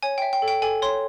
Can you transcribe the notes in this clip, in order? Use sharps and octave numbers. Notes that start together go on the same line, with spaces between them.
C#5 G#5
E5 G5
G5
A4
G5
A4 G#5
C#5 C6